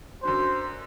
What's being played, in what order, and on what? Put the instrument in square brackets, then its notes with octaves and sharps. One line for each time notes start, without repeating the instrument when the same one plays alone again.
[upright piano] F#2 D3 F#3 [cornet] C5